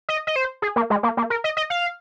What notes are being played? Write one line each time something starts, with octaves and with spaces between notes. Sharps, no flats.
D#5
D#5
C5
G#4
A#3
G#3
A#3
A#3
A#4
D#5
D#5
F5